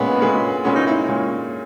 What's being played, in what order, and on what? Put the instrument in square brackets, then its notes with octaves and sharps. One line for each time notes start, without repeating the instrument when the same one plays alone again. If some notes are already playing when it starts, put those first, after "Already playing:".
Already playing: [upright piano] A#2 G#3 C#4 [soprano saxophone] B3
[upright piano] A#2 G#3 C#4
[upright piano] A#2 G#3 C#4 [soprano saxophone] B3
[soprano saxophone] D#4
E4
[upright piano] A#2 G#3 C#4